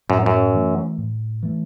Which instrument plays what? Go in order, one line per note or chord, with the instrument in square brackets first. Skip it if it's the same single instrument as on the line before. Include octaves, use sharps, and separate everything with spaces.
[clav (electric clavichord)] F#2 [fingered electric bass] A2
[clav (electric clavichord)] F#2
[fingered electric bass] E3 A3
A2
E3 A3